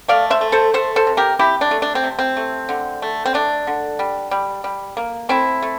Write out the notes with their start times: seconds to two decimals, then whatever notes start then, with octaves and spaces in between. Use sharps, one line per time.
0.08 A3 D5 F5
0.30 C5 E5
0.41 A3
0.52 A4 C5
0.74 A3 A4 C5
0.96 A4 C5
1.07 C3
1.17 G4 A#4
1.39 C3 E4 G4
1.61 D4
1.71 A3
1.82 D4
1.95 C4
2.04 C3
2.19 C4
2.37 A3
2.69 D3
3.02 A3
3.26 C4
3.34 A3 D4
3.67 D3
3.99 G3
4.31 G3
4.64 G3
4.97 A#3
5.29 A3 C4 E4
5.62 A3